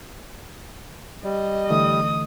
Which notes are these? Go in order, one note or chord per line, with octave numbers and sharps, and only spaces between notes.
G3 D#5
D3 E3 A3 D#6